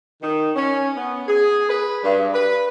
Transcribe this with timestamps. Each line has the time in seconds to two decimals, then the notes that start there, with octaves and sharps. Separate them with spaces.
0.21 D#3
0.56 C#4
0.96 B3
1.28 G#4
1.69 B4
2.04 G2
2.34 B4